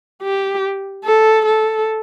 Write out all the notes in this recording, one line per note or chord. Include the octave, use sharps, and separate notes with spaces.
G4
A4
A4